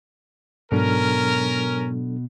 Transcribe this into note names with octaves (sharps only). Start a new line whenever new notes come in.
G#2 B2 F#3 C#4 D4 A4 A#4